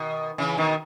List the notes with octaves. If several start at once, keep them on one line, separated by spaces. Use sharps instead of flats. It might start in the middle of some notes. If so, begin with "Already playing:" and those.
Already playing: B2 D#3
C#3 E3
B2 D#3